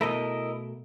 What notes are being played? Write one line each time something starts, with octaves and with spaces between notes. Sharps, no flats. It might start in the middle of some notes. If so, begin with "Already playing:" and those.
B2 A3 E4 A#4 D#5